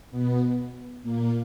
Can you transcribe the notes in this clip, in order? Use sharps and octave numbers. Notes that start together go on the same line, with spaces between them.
B2 B3
A#2 A#3